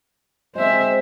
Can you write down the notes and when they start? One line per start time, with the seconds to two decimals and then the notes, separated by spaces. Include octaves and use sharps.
0.55 G#3 C4 C5 E5